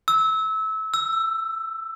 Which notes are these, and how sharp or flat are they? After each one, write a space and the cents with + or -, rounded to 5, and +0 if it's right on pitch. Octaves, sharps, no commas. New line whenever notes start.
E6 -25
E6 +15